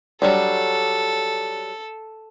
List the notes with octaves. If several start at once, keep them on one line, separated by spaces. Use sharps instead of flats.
F#3 G3 D4 A4